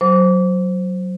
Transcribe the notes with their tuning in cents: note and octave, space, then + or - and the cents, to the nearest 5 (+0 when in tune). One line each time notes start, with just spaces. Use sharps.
F#3 +0 C5 +0 D6 -30